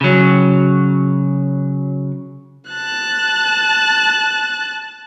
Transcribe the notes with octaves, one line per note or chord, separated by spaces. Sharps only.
C#3 F#3
A5 F#6